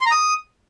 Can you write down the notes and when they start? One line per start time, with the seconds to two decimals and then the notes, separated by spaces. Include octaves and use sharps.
0.01 C6
0.06 A#5
0.11 D#6